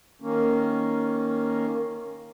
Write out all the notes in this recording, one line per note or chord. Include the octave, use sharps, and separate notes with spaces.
D#3 A#3 C#4